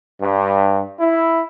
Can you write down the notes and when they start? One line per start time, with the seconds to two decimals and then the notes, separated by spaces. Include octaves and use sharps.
0.22 G2
1.00 E4